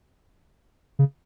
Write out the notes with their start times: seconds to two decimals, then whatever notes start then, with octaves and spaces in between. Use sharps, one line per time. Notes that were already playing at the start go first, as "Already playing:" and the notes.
0.99 C#3